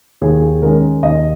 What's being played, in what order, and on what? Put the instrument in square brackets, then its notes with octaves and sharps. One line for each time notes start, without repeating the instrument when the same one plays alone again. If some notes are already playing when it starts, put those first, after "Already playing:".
[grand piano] D#2 G#4
G#4
D#3 G#3 C#4 A#4
D#2 D#5